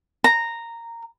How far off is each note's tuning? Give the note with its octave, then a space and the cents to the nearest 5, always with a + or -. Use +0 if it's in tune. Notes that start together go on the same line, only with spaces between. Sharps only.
A#5 -10